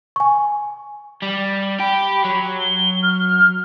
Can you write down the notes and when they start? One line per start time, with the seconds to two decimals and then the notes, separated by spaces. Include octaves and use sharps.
0.16 G#5 C#6
1.22 G3
1.80 G4 B5
2.24 F#3
2.60 G7
3.03 F6